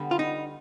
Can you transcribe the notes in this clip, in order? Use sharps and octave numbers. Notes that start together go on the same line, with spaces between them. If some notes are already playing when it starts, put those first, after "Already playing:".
Already playing: D3 G3 B3
F4
D#4